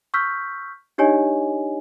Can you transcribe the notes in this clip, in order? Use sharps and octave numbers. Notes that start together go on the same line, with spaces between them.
C#6 E6 F6 G6 B6
D4 D#4 G4 C#5 D#5 G#5